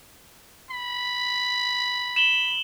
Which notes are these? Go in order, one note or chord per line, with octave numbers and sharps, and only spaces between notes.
B5
E7 F#7 G7